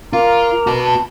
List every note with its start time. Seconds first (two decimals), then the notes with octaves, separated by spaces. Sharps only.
0.13 F4 A#4 A#5 D6
0.67 F#4 B4 A5